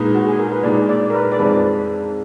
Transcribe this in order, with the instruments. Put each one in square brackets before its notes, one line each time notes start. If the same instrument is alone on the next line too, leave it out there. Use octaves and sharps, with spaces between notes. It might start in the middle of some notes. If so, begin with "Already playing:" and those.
Already playing: [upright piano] A#2 G#3 D#4 [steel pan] B4
[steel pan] F#4
G#4
A#4
B4
[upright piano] A#2 G#3 D#4 [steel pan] D5
[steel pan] D5
A#4
B4
D5
[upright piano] F2 F3 G#3 D#4 [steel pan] B4